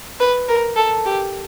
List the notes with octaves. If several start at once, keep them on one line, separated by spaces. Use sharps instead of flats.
B4
A#4
A4
G4